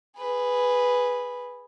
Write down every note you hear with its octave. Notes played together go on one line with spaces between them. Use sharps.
G#4 B4